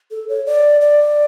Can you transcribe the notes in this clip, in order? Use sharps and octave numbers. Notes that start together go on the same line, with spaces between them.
A4
C#5
D5
D5